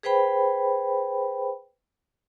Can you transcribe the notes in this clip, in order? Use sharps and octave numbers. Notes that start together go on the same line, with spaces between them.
G#4 B4 C5 G5 B5